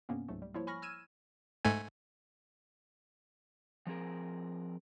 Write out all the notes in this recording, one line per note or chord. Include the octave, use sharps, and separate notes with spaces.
G2 C3 A#3 B3 C#4
C#2 G#2 F#3 A3
G3
F3 G3 A#3 E4 C#5
G#5 B5 C#6 F6 A#6
E6 F6 G#6 D#7 E7
G#2 A3 G#5
F3 C4 G#4 A#4